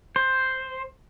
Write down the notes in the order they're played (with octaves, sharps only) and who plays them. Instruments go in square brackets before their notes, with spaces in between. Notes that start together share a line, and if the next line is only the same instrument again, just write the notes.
[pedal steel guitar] C5